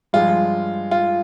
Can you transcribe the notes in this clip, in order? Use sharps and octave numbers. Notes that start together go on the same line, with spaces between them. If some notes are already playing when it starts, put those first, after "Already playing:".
G2 F3 G#3 F4
F4